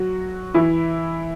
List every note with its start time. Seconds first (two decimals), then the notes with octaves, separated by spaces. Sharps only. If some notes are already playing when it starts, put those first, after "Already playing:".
Already playing: F#3 F#4
0.54 E3 E4